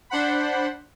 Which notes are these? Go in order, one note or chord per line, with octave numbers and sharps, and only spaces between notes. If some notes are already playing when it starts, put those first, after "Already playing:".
D4 C5 F#5 B5